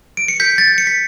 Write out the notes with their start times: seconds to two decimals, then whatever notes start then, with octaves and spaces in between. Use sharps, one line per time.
0.17 D7
0.28 C#7
0.40 G6 B6
0.58 A6
0.68 G6
0.78 C#7
0.87 B6